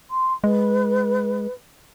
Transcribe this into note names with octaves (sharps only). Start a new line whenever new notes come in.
C6
G#3 B4